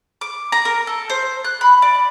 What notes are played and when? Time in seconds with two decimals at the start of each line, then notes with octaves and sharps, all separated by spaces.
0.21 D6
0.52 A#5
0.65 A#4
0.87 A4
1.10 C5
1.45 F#6
1.61 B5
1.82 D5